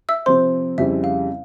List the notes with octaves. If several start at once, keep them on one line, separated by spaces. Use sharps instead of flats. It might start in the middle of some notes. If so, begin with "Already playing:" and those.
E5 E6
C3 F3 C4 C5 C6
F2 C#3 G3 C4 E4 E5
F5